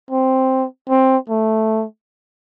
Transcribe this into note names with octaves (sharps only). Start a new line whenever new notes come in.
C4
C4
A3